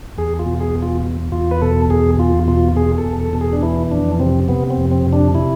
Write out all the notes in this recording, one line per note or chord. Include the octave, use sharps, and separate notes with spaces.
E2 G#4
F4
B2
G#4
E2
F4
E2
E2 F4
B4
B2 A4
E2 G#4
E2 F4
B2 F4
B2 G#4
A4
E2
A4
B2
G#4
D4
E3 E4
F2 D4
C3 C4
C3 B3
C4
F2
C4
C3
D4
C3 E4